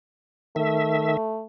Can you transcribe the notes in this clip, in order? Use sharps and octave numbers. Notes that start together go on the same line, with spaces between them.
D#3 A3 E5